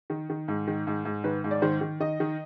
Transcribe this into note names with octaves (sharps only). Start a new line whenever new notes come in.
D#3
D#3
G#2
D#3
G#2
G#2
D#3 B4
G#2
D5
D#3 C5
D#3
D#3 D#5
D#3